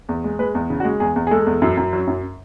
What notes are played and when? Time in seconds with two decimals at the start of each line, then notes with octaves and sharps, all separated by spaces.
0.09 E2
0.24 G#3
0.39 G#3 B4
0.55 E2
0.70 C#3
0.80 F#4
0.85 G#3
1.00 E2 G#4
1.16 E2
1.27 G#4
1.31 G#3 A4
1.46 E2
1.62 F#2
1.77 F#2
1.93 F#3
2.08 F#2